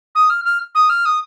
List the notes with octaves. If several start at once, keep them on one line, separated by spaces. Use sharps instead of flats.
D#6
F6
F6
D#6
F6
D#6